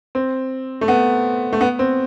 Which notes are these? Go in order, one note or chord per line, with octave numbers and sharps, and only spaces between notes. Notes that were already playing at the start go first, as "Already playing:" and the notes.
C4
A3
B3
A3
B3
C4